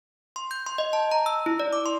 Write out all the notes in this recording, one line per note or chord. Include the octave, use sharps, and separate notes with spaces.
C6
G6
C6
D#5
A5
A#5
E6
E4
D5
D6
C6